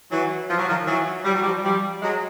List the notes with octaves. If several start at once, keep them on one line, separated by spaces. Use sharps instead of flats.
E3 F#3
F3
F#3
D#3 F3
E3 F#3
G3
F#3
F3 G3
F3 G3
F#3 G#3